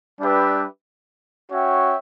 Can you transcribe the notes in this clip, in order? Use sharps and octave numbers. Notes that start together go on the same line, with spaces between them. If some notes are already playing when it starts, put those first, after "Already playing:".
G3 D4 G4 B4 E5
C#4 F#4 C#5 E5 G5